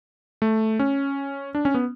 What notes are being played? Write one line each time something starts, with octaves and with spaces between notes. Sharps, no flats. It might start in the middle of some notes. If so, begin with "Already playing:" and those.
A3
C#4
D4
C#4
B3